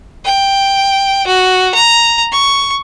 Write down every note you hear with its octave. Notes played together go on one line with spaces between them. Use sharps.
G5
F#4
A#5
C#6